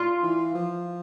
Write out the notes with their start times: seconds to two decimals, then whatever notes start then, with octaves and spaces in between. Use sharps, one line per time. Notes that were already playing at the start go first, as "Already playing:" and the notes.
Already playing: F4
0.23 E3
0.55 F3